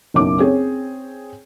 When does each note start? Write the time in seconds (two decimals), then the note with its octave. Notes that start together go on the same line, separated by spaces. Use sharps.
0.14 F#1 B1 D6
0.39 C4 G#4 C#5